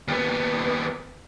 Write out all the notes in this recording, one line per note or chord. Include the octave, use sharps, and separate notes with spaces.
D#2 B3